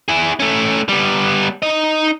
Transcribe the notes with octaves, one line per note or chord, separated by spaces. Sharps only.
E4 G#4
A3 C#4
G3 B3
D#4 D#5